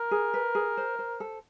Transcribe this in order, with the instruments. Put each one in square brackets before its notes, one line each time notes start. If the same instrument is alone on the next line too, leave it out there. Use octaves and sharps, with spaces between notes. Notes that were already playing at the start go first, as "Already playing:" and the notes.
Already playing: [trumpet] A#4
[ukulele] G#4
B4
G#4
C5
C5
A4